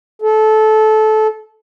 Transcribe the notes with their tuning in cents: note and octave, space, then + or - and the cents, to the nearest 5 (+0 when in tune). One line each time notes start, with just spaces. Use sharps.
A4 -20